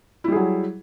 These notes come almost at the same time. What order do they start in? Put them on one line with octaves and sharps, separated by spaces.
E4 G3 G#4 F#3